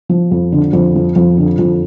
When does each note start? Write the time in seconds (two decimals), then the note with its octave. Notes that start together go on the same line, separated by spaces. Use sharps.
0.09 F3
0.31 F2
0.52 D3
0.73 F2
0.95 F3
1.16 F2
1.37 D3
1.59 F2